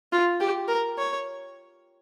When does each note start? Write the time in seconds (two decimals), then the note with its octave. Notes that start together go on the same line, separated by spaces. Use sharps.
0.12 F4
0.40 G4
0.69 A#4
0.98 C#5